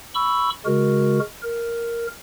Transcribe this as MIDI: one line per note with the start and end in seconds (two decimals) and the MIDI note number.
0.14 0.50 83
0.14 0.50 85
0.14 0.50 88
0.66 1.19 49
0.66 1.19 56
0.66 1.19 66
0.66 1.19 70
1.43 2.07 70